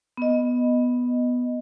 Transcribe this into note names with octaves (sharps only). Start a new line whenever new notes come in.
B3 D#5